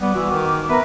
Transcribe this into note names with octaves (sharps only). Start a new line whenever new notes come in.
G3 B3 D6
E3 F#4
D#3
B3 A#4 B4 E5 A#5